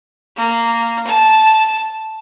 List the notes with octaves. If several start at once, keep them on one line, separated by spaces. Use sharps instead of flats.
A#3
A5